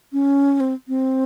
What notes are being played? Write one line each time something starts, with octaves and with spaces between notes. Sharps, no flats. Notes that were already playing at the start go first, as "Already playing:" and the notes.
C#4
C4
C4